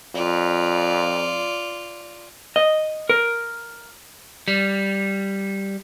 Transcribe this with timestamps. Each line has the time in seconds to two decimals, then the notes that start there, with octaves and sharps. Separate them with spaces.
0.15 F2 F4 D5
2.56 D#5
3.10 A#4
4.48 G3